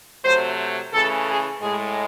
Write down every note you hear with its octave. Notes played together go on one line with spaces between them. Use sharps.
C3 F#3 A3 C5
C#3 E3 A3 A4
G#4
A2 G#3 G#4